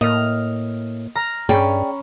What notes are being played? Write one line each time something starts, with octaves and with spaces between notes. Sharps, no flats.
A2 A#3 D#5 F6
A#5 F6
G2 C#4 G#4 D5 G5 A#5 B5 C#6